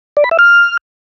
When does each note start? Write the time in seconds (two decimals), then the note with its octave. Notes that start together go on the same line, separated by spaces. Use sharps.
0.17 D5
0.24 B5
0.31 E5
0.39 F6